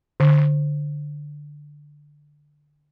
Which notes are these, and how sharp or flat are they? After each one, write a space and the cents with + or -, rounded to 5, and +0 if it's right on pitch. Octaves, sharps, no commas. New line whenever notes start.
D3 +5